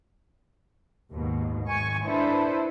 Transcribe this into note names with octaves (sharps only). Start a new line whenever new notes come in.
D#2 G#2 B2
G#1 G#2 G#5 C#6
D4 E4 A4 B4 C5